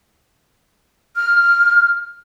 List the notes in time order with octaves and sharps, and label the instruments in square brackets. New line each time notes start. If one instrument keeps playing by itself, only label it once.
[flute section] F6